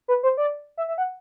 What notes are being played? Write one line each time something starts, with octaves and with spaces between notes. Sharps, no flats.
B4
C5
D5
E5
E5
F#5